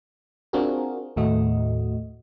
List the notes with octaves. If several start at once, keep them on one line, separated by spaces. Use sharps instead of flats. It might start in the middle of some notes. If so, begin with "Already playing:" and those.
C4 D4 F4 F#4 G#4 A#4
D#2 A2 A3 F#4 D#5